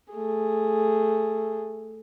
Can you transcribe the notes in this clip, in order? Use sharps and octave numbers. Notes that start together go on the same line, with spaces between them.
A3 G#4